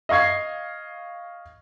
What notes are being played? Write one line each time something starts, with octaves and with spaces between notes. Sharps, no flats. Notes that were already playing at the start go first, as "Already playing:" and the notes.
D#5 F5 C#6 G#6 C7